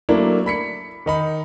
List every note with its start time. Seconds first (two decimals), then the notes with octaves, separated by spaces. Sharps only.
0.09 F#3 A3 A#3 D4 E4
0.46 B5 B6 C#7
1.06 D#3 D#4 B5